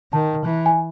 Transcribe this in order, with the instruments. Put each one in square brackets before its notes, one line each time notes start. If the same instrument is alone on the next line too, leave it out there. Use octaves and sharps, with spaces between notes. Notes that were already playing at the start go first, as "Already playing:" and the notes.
[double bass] D#3 [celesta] A5
[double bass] E3
[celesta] G#5